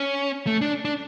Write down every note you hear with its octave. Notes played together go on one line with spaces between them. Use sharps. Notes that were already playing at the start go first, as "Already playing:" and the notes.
Already playing: C#4
A3
D4
D4